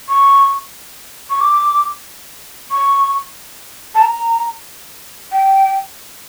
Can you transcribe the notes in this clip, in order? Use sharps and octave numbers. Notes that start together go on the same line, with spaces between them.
C#6
C#6
D6
C#6
A5
A#5
G5